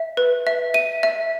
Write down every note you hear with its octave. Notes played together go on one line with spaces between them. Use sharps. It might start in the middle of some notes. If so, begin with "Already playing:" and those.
Already playing: E5
B4
E5
E5 D#7
E5